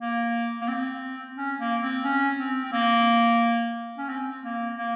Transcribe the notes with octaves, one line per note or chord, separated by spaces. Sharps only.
A#3
A#3
C4
C#4
A#3
C4
C#4
C4
C4
A#3
C#4
C4
A#3
A#3